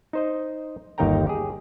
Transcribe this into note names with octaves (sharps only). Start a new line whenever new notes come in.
D#4 C5 D#5
G1 D#2 D#4 A#4 G5 A#5
G4 G#4